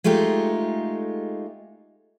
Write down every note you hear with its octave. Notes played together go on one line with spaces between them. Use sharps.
G#3 A3 D#4 F4 G4